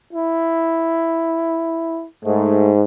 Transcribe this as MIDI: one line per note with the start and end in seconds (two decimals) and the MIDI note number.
0.13 2.05 64
2.25 2.85 44
2.25 2.73 57